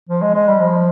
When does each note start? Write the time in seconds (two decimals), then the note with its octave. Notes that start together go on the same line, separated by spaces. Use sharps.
0.09 F3
0.22 G#3
0.34 G#3
0.48 G3
0.60 F3